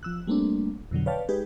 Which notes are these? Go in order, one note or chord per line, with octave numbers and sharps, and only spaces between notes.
F3 E6 F#6
G3 A3 A#3 C4 D4
F2 B2 D3 F#3
B4 C#5 D5 F5 G5 A5
G#3 D#4 G4 G#4 B4